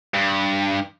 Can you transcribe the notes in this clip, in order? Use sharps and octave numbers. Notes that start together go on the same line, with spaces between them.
G2